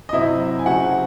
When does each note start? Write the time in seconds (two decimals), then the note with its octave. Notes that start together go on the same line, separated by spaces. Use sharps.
0.09 D#5
0.13 C3 F#3 C4 E4 E5
0.59 G#5
0.66 C#3 F#3 C4 F#4 F#5